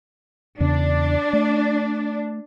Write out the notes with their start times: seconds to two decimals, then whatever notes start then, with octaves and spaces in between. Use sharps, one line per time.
0.60 E2 C#3 C#4 D4
1.33 A3